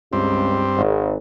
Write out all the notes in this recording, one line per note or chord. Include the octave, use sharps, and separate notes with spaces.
C#2 G2 C4
G#1